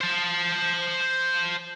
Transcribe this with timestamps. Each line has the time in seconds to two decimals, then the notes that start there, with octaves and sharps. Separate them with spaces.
0.01 C5 A5